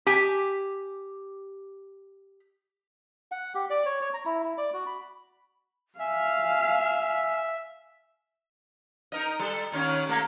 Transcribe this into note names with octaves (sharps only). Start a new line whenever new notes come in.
G4 G#5
F#5
G4
D5
C#5
C#5
A#5
E4
E4
D5
F#4
B5
E5 F5 G#5
D#4 A#4 D#5
G3 A4
D#2 D#3 C#4
A3 A#3 A4